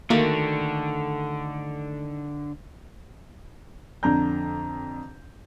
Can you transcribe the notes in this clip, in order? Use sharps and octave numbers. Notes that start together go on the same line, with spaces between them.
D3 D#3 A3 A#3 F#4
F2 D3 D4 A#5 G6